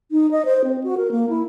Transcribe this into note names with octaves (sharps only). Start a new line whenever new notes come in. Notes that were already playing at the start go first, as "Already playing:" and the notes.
D#4
D#5
C5
C4
F#4
A#4
A#3
E4